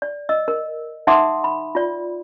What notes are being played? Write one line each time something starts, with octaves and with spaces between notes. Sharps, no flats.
D5
D#5 E6
A#4
D#4 E5 F#5 C6 D6 D#6
B5
F4 D5